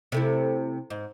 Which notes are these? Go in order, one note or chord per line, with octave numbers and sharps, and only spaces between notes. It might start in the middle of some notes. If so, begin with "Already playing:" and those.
C3 A3 E4
G#2